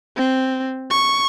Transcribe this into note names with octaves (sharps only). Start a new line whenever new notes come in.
C4
C#6